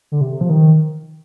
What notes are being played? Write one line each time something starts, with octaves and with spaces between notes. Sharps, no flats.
D3
C3
F3
D#3